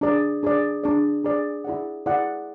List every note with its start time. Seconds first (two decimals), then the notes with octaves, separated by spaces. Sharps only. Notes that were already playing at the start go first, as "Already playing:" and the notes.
0.01 D4 G#4 D5
0.43 D4 G#4 D5
0.84 D4 G#4 D5
1.24 D4 G#4 D5
1.64 E4 G#4 D5 F#5
2.06 E4 G#4 D5 F#5